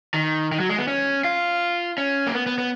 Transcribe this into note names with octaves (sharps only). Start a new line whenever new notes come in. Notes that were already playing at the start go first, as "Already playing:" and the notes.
D#3
D#3
F#3
G#3
B3
C#4
F4
C#4
A#3
B3
B3
B3